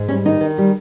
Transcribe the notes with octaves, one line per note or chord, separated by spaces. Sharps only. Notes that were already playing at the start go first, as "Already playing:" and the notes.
Already playing: G#2
G3 C#4
D#3 D#4
D#3
G3